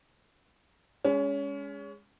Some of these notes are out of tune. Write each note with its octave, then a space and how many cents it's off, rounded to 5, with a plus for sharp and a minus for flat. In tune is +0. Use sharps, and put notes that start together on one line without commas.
G#3 -15 C#4 +25